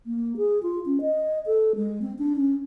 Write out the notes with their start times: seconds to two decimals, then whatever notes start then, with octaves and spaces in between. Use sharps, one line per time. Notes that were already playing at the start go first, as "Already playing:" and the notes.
0.06 A#3
0.37 G#4
0.63 F4
0.86 C#4
1.01 D#5
1.46 A4
1.76 G#3
2.02 C4
2.19 D4
2.36 C#4